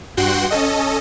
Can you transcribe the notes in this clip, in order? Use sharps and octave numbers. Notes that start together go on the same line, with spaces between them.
G2 F#4 F#5 G5 C6
C#4 A4 D#5